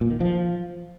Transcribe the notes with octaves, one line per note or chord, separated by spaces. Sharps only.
A#2
D#3
F3